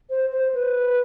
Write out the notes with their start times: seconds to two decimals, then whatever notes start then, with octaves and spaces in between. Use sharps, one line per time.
0.10 C5
0.32 C5
0.54 B4